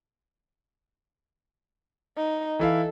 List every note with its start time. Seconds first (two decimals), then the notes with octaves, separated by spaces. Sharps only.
2.17 D#4
2.59 E3 E4 A4 F5